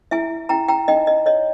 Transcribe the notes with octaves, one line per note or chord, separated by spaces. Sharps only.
E4 E5 G#5
E4 G5 A#5
G5 A#5
D#4 D#5 G5
D#5
C#5 D#5